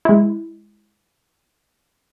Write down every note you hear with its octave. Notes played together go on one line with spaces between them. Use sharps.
G#3 E4